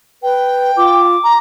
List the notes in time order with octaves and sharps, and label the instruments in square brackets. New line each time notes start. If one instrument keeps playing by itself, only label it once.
[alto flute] B4 [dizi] G5
[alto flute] F4 [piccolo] D6
[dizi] A#5